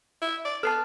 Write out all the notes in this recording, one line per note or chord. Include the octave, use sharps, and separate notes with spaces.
E4
D5
B3 A4 A5 F6 C7